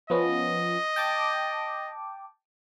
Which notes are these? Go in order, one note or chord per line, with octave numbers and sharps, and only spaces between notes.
F3 B3 C#4 D#5
G5 A5 D6